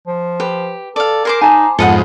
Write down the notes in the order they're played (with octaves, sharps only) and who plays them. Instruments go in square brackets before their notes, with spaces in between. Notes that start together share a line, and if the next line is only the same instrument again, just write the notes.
[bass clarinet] F3
[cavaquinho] G4 [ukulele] B4
[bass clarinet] A4 [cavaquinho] D5 F5
[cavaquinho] G#4 C5 D6 [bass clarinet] A#4
[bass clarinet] D#4 [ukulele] G#5 A5
[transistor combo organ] F2 G#2 [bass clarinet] B3 [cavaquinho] A4 D#5 F#5